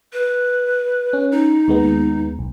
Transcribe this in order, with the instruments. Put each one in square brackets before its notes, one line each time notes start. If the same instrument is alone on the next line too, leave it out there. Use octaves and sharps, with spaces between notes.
[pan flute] B4
[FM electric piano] C#4
[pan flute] D#4
[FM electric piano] D#2 G#3 B3
B1